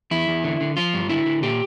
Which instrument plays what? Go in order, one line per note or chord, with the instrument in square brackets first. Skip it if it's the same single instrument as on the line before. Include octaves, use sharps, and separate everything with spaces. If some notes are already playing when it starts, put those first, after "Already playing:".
[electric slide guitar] E2 E4
E2
D3
D3
F3 F4
G2
D3 E4
D3
A#2 G4